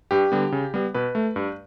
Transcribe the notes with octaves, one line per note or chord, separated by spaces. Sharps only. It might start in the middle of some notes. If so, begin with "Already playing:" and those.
G2 G4
D3 G3 B3
C#3
G3 B3
B2 B4
A3
G2